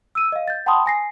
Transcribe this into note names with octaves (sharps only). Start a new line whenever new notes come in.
E6 D#7
D#5 F5
G6 A6
F#5 G5 A5 B5 C6 D#6
G#5 A#6 C7